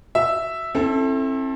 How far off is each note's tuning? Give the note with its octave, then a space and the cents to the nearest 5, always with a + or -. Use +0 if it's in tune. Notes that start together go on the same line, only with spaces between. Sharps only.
F#4 +5 E5 +0
C4 +40 E4 +0 A4 +0